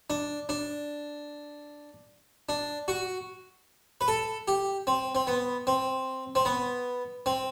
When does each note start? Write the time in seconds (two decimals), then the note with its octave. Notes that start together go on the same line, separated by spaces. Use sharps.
0.10 D4
0.49 D4
2.49 D4
2.88 F#4
4.01 B4
4.08 A4
4.48 G4
4.87 C4
5.15 C4
5.27 B3
5.67 C4
6.35 C4
6.45 B3
7.26 C4